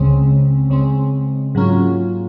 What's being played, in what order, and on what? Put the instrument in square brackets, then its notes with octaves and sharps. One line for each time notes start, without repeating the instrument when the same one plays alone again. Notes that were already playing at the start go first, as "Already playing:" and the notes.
Already playing: [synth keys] C#2 C#3 G#3 C4
C#2 C#3 G#3 C4
G#2 F#3 A#3 C#4 F4